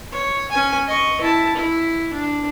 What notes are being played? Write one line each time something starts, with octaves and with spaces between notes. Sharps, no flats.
C#5
C#4 G#5
D#5 C#6
E4 A5
E4
D4